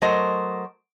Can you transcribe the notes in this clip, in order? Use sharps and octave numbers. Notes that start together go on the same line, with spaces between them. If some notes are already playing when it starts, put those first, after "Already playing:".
F#3 A3 A#4 C5 D#5